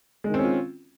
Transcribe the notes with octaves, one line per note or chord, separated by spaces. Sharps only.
D#3 G#3 C4 C#4 F4